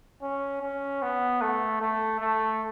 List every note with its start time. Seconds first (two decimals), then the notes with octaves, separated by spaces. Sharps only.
0.22 C#4
0.62 C#4
1.02 B3
1.41 A3
1.81 A3
2.20 A3